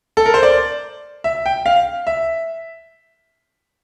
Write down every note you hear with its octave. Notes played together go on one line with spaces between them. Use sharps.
A4
A#4
C5
D5
E5
G5
F5
E5